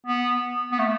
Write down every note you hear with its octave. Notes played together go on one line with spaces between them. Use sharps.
B3
B3
A3